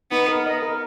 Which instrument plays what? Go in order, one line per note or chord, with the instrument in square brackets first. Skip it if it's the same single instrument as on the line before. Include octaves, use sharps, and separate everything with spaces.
[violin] B3 [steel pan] D#4
[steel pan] A#4
D#5
A#4